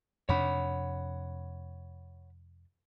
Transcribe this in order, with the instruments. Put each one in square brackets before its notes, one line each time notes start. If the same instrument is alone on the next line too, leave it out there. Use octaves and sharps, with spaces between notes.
[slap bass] F2 C3 D4 [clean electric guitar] C#5 F#5 B5